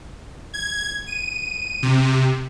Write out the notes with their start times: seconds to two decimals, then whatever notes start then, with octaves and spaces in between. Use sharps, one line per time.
0.54 G#6
1.07 D#7
1.83 C3